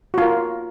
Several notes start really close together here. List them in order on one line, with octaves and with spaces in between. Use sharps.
F#4 F4 A#4